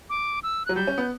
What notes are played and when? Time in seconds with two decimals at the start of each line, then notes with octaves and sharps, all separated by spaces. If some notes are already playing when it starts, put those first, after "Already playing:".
0.10 D6
0.43 E6
0.66 F#3 F#6
0.76 G3 G6
0.87 C#4
0.98 B3